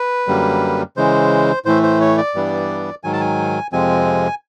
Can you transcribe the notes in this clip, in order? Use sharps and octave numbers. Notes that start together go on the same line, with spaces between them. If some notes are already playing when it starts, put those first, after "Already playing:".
Already playing: B4
F#2 D3 G3 A#3
C#3 E3 G#3 C5
A2 E3 A3 C5
C5
C#5
D5
G2 E3 G3 B3 D4
G#2 D#3 F#3 G#5
A5
G#5
F2 C3 F3 G#3 C4 G#5